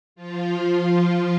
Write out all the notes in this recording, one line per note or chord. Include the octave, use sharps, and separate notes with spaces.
F3 F4